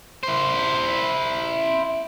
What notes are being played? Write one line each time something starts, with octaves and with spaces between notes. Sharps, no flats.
E4 C5